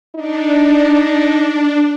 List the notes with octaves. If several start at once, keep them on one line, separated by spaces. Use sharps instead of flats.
D4 D#4